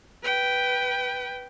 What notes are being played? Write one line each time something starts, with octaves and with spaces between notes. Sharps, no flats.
B4 G5